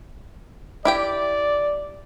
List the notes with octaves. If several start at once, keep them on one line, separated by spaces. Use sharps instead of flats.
E4 G4 D5 G5